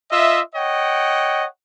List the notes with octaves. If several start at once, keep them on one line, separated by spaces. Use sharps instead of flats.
F4 D#5 E5
C#5 D#5 F#5 G5